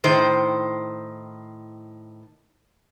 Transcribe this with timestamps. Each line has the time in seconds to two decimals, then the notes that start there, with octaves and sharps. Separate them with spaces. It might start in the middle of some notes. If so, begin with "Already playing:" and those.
0.04 A2 D#3 C5